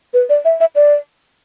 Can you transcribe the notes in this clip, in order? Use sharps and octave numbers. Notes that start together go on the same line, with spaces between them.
B4
D5
E5
E5
D5